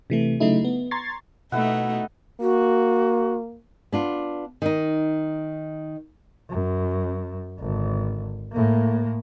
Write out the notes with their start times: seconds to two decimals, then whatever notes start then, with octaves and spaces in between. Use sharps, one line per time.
0.10 C3 E3 A3
0.40 C#3 F#3 A3 D#4 E4
0.65 B3
0.91 A#5 C6 C#6 G#6 A6 C7
1.52 B2 A3 D#4 E4 F#5
2.41 A#3 F#4
3.92 B3 D4 F4
4.62 D#3 D#4
6.49 F#2
7.59 G#1 D3
8.52 A2 A#3